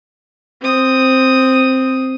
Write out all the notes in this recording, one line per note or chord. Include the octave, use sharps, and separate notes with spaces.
C4 D#6